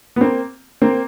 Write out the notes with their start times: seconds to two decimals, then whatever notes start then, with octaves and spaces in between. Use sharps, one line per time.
0.16 B3
0.21 A#3 C4
0.82 A#3 C4